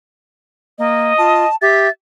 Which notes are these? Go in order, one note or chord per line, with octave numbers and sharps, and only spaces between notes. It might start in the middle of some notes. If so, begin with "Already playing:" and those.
A#3 D#5
F4 A5
G4 E5 A6